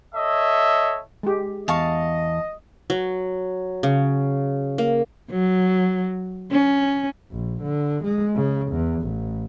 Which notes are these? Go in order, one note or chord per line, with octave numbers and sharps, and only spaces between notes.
A4 C#5 D#5 E5
G#3 G4
E2 D#5 F5 A5 C#6
F#3
C#3
A#3
F#3
C#4
A#1
D3
G#3
C#3
E2
A1